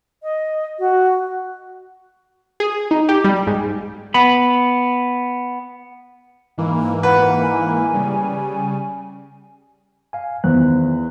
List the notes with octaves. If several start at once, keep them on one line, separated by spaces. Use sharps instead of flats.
D#5
F#4
G#4
D#4
G4
G3
G#2
B3 B5
G#2 E3 A#3
B4 F#5
G#5
C#3 G3
F5 G#5
E2 D#3 C5 F#6